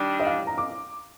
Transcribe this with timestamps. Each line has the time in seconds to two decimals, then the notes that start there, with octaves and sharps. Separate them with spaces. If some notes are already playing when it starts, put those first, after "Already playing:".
Already playing: D#3 G3 D4
0.20 D#5
0.26 F5
0.47 A#5
0.58 D6